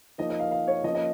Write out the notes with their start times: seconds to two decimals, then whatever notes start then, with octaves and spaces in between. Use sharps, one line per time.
0.18 F3 A#3 D#4 D#5
0.29 D#5
0.40 F5
0.51 F5
0.68 C#5
0.84 F3 A#3 C#4 D#5
0.95 D#5